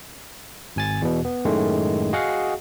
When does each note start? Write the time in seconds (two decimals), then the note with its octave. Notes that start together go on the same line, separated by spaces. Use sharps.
0.76 G#1 G#5 A6
1.02 E2 B2
1.25 B3
1.45 F#2 A2 D#3 G#3 A3
2.13 F#4 G#4 D#5 F5 F#5